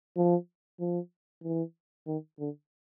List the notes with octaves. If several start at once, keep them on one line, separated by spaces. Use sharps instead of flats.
F3
F3
E3
D#3
D3